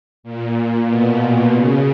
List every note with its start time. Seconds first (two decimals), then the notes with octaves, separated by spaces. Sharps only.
0.23 A#2
0.88 B2
1.52 C#3